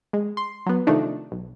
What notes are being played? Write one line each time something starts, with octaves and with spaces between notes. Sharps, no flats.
G#3
C6
F#3 B3
C3 D#3 F3 A3 D4 D#4
B1